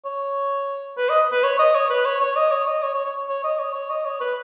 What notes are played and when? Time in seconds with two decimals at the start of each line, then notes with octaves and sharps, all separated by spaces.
0.05 C#5
0.98 B4
1.10 D#5
1.32 B4
1.44 C#5
1.59 D#5
1.75 C#5
1.90 B4
2.06 C#5
2.21 C#5
2.36 D#5
2.52 C#5
2.67 D#5
2.83 C#5
2.94 C#5
3.06 C#5
3.29 C#5
3.44 D#5
3.59 C#5
3.74 C#5
3.90 D#5
4.05 C#5
4.21 B4